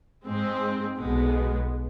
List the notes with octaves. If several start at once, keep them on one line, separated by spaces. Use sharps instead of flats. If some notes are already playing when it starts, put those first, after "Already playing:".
G#2 G#3 C4
B1 B2 G#3 B3